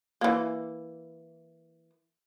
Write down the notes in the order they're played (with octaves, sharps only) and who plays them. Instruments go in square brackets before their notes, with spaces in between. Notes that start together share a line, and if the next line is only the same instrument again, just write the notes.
[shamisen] E3 A#3